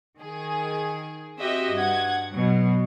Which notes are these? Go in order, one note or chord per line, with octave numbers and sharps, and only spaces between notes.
D#3 G#4
C4 F#4 G4 D#5 E5
G2 F#5 G#6
B2 F#3